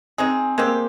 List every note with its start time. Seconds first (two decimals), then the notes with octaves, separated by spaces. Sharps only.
0.18 G#3 C4 D#4 G#4
0.58 G#3 A#3 C4 G4